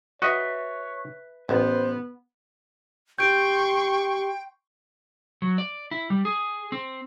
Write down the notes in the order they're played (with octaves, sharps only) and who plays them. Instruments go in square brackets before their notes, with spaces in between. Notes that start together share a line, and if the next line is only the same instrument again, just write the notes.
[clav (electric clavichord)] F#4 D#5 [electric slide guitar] B4 E5 [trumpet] C#5
[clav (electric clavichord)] A1 [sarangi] B3 [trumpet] C5
[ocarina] G4 [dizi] G5 [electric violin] C6 C#6 [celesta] G6 D7
[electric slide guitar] F#3
D5
E4
G3
G#4
C4